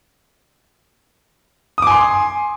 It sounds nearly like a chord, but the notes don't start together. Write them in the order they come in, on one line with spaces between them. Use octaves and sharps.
D#6 D6 G#5 C6